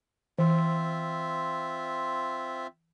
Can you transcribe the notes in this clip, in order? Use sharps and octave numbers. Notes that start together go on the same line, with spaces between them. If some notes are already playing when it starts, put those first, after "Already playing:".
E3 C4 F4 E5